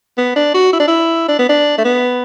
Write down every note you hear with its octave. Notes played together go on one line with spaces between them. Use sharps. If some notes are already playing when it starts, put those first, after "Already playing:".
B3
D4
F#4
E4
D4
E4
D4
B3
D4
A3
B3